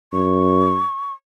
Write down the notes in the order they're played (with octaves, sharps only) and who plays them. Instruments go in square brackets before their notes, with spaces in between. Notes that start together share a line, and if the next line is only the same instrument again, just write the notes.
[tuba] F#2 [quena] C#6